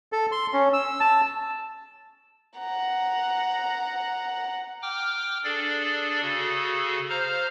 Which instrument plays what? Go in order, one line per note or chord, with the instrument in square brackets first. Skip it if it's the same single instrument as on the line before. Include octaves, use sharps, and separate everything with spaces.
[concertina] A4
C6
C#4
E6
A5
[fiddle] F#5 A#5
[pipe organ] G5 D6 F6
D4 G#4 A4 D5
C#3 F#4 G#4 A4
C5 F5 A#5 F6